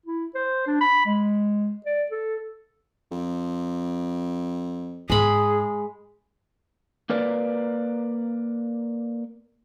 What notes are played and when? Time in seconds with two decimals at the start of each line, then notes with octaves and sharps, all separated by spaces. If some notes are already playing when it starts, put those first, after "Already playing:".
0.06 E4
0.35 C5
0.67 D4
0.81 B5
1.06 G#3
1.86 D5
2.11 A4
3.11 F2
5.10 G#2 G#3 D#4 G#4 B5
7.10 A#3 A#4 B4 D5